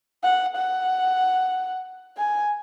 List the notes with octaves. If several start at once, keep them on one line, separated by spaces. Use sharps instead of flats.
F#5
F#5
G#5